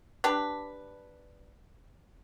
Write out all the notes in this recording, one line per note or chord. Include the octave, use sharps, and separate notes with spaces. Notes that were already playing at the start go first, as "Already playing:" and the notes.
D4 G4 B4